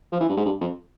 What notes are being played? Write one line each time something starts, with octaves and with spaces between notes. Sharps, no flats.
F3
E3
G2
G#2
G2
F2